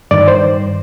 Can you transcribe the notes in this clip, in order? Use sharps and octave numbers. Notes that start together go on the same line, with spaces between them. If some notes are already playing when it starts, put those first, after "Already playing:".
G2 D#3 D5
C5